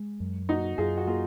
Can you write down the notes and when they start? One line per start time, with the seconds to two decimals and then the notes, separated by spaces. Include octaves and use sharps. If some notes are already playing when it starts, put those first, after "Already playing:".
Already playing: G#3
0.20 F#2
0.49 A#3 D#4 F#4
0.78 F#2 F4 G#4
0.97 F#4
1.07 A#3 F4 G#4